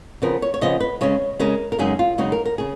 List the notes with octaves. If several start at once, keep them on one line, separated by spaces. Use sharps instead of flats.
C#3 F3 B3 A#4
C#5
C#5
C#3 F3 B3 D#5
B4
C#3 G#3 C#4 C#5
C#3 G#3 C#4 A#4
A#4
F#2 C#3 G#3 D#4 G#4
F4
F#2 C#3 G#3 D#4 F#4
A#4
A#4
C#3 G#4